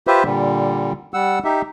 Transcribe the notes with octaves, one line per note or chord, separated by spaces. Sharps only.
F4 G4 B4 C5 E5
A#2 D3 G3
G3 F#5 E6
D#4 G4 E5